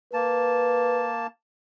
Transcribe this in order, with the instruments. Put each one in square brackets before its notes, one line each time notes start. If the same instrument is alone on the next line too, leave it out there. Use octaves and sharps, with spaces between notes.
[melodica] A#3 A5 [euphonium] B4